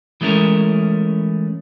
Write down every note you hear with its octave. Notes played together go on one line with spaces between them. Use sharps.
E3 G#3 A3 C#4 A#4